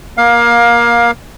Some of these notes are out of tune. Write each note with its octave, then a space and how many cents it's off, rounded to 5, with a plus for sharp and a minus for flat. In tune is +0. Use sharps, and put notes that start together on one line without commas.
A#3 +25 F5 +20